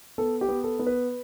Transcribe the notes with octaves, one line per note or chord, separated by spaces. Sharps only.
B3 A4
G4
B3
A4
B3
B4